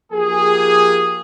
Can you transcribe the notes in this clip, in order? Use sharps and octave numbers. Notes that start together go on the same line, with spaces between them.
F3 A#3 G4 G#4